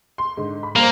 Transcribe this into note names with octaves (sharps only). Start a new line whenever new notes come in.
C6
G#2 D3
B5
G3 A#3 C5